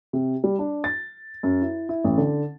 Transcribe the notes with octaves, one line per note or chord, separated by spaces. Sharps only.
C3
G3
D4
A6
F#2
E4
E4
A1
D3